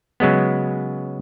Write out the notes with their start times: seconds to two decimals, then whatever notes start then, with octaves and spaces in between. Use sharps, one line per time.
0.20 C#3 F#3 G#3 B3